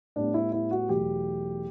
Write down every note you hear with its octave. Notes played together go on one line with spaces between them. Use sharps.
A2 G3 B3 D4
E4
E4
F#4
E2 B2 F#3 A3 G4